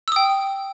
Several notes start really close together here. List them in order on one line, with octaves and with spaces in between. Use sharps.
E6 D#6 G5